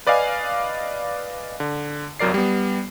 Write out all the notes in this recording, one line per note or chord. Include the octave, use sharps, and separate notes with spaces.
B4 D5 D#5 F5 G#5
D3
G1 C2 F#3 A#4 D5 C7
G3 B3